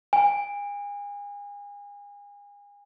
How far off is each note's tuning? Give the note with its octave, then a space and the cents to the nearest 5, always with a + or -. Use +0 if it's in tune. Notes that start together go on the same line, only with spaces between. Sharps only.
G#5 -35